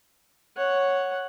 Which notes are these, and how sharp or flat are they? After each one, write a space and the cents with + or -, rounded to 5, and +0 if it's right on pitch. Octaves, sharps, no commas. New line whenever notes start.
C#5 +0 F#5 +0